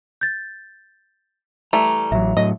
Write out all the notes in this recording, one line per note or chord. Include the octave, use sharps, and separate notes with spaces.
G6 A6
E3 G3 A3 A#5
A1 F#3 E5
A2 F#3 D#5